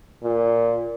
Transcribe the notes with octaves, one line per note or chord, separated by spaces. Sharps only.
A#2